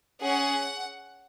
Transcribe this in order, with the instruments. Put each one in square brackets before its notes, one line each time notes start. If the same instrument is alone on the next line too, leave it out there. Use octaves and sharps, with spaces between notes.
[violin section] C#4 G#4 F#5